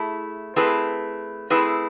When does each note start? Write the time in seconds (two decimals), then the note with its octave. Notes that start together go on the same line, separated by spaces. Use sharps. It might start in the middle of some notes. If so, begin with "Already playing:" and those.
Already playing: A3 E4 G#4
0.56 A3 C4 E4 G#4 B4
1.50 A3 C4 E4 G#4 B4